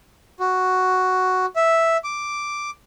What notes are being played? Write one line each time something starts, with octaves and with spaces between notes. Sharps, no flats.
F#4
E5
D6